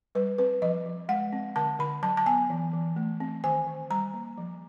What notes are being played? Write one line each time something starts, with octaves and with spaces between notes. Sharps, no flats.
G3 B4
C4 B4
F3 D#5
F3
G#3 F#5
C4
D3 A5
D3 B5
F#3 A5
A5
B3 G#5
E3
E3
A3
C4
D#3 G#5
D#3
G3 A#5
A#3
F3